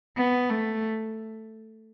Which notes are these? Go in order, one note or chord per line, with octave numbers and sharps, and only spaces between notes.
B3
A3